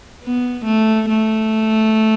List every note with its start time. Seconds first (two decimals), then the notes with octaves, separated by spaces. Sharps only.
0.23 B3
0.65 A3
1.09 A3